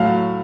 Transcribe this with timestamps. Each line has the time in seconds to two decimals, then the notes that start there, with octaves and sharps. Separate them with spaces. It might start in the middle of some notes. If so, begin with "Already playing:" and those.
Already playing: A2 F#3 A3 F5